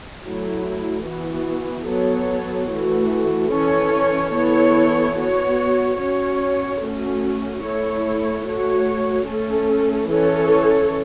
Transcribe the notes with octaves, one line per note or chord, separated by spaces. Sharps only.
F#3 A3 E4
E3 B3 F#4
F#3 B3 A4 C#5
E3 A3 F#4
E3 C#4 A4 C#5
E3 B3 E4 A4 C#5
B3 F#4 C#5
C#4 F#4 C#5
A3 C#4 F#4
A3 E4 A4 C#5
A3 F#4 C#5
A3 C#4 A4
E3 C#4 A4 C#5